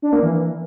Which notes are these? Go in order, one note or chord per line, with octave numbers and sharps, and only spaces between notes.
D4
A#3
E3